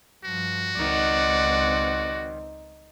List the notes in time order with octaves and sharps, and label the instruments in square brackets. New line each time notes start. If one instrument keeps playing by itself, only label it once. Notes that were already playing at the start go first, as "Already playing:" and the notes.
[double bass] G2 F3 [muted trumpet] F#4
[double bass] C#2 C4 [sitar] D#3 [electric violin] D5 F#5